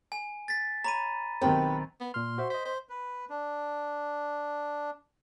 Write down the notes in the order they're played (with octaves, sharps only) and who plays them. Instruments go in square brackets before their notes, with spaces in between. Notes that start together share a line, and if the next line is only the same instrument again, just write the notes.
[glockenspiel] G#5
A6 B6
[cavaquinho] C#5 [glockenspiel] A#5 B5 D#7
[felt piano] B1 D#3 C4 [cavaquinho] G4 B4 G5
[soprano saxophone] B3
[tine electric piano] A#2 F6 [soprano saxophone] C6
[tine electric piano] F#4 C5 E5
[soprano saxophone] C5 [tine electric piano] D#5 B6
[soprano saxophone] C5
[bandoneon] B4
D4